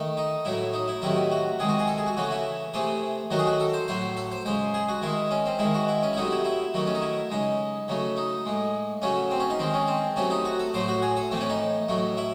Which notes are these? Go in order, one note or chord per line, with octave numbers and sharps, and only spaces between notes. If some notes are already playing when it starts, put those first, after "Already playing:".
Already playing: D#3 A3
D#4
A2 F#3 A3 E4
D#4
E4
C3 D#3 F#3 A3 E4
F#4
C3 D#3 G#3 G#4
F#4
G#4
A4
G#4
F#4
C#3 E3 A3 F#4
E4
C3 E3 A3 G#4
D#3 F#3 A3 F#4
G#4
F#4
A4
C5
A2 F#3 A3 C5
A4
C5
C#3 G#3 C5
G#4
F#4
D#3 G#3 E4
C#4
C4
D#3 G#3 E4
F#4
E4
C#4
E4
C3 F#3 A3 D#4
E4
E4
D#3 F#3 A3
C#4
D#4
E4
C#3 G#3 D#4
C#3 F#3 A3
D#4
A2 G#3
C#3 F#3 A3 C#4
C4
C#4
D#4
D#3 G#3 C4
C#4
C4
C3 F#3 A3 C#4
D#4
F#4
A4
A2 F#3 A3 C5
F#4
G#4
A4
A2 E3 A3 C4
C#4
D#4
A2 F#3 A3
E4